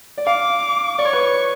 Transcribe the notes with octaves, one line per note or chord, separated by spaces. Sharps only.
D5
F5 D6
D5 C#6
C#5
B4
C#5